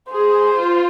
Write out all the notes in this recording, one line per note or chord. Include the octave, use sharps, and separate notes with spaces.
G#4 C5
F4